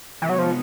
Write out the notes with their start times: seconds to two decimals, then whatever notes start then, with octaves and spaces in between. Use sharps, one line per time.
0.21 C3 D#3 E3 G#3 B3 D#4
0.29 F#3
0.39 F3